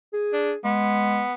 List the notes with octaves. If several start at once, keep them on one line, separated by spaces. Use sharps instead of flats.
G#4
D4
G#3 B3